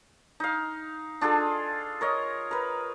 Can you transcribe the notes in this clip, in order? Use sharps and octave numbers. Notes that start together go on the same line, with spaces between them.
D#4 F5
D4 F4 G#4 A4
A#4 C#5 D#5
A#4 B4